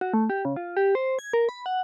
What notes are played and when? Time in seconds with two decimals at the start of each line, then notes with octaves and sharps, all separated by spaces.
0.01 F#4
0.14 A3
0.30 G4
0.45 C#3
0.56 F4
0.77 G4
0.95 C5
1.19 G#6
1.33 A#4
1.49 B5
1.66 F#5